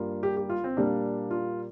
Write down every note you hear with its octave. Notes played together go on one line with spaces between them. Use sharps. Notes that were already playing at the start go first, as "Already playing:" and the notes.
Already playing: G2 G3 A#3 F4
G4
G4
F4
C4
A#2 G3 A#3 D4
F4